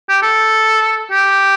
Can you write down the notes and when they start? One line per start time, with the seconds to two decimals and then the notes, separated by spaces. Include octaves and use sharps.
0.09 G4
0.22 A4
1.11 G4